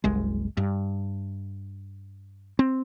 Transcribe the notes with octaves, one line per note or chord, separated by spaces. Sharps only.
F#1 C2 G#3
G2
C4